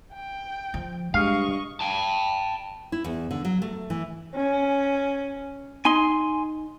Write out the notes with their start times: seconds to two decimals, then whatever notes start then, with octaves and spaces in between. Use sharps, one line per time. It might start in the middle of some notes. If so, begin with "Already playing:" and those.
0.13 G5
0.74 F3
1.14 G2 G#3 D#5 F5 C#6
1.80 G5 A5
2.92 E4
3.04 E2
3.31 D3
3.45 F#3
3.62 A3
3.90 E3
4.34 C#4
5.85 D#4 G#5 C6